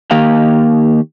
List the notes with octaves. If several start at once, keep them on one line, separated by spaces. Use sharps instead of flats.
D#3 A#3 G4 F5